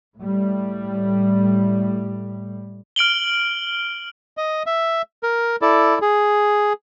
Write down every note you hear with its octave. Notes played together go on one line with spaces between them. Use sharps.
A2 G3
F6 D7 F#7 G7
D#5
E5
A#4
E4 A4 D5
G#4